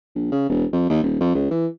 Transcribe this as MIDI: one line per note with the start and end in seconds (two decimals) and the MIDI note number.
0.15 0.30 34
0.32 0.46 49
0.49 0.65 28
0.73 0.85 41
0.90 1.01 39
1.03 1.16 27
1.21 1.33 41
1.35 1.47 37
1.51 1.67 52